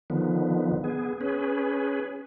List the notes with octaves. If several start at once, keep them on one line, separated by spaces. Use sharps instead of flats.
D3 D#3 F3 B3
B3 G#4
C#4 G#4 B4